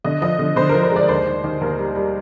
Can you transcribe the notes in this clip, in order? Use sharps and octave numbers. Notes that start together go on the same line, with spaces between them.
D3 D#5
F3 D#5
D3
D3 C5
F3 A#4
C5
G#3 D5
D#2 C5
D#3
D#3
D#2 A#4
G3
G3